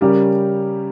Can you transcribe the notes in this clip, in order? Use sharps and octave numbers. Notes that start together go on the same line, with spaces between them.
C#3 G3 C#4 G4 A#4